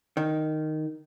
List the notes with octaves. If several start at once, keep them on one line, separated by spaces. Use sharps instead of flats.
D#3